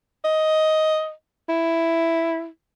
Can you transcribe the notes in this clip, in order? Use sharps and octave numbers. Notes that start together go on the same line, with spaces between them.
D#5
E4